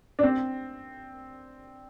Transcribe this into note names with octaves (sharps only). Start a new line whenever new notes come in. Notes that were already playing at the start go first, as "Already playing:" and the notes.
D4
C4